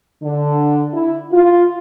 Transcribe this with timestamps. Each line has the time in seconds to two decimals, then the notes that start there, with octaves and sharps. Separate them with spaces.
0.22 D3
0.92 E4
1.32 F4